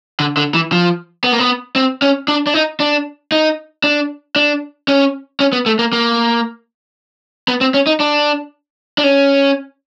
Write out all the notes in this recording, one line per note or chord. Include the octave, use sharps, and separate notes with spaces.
D3
D3
E3
F3
B3
A#3
B3
C4
C#4
D4
D4
D#4
D4
D#4
D4
D4
C#4
C#4
B3
A3
A#3
A#3
B3
C4
C#4
D#4
D4
D4
C#4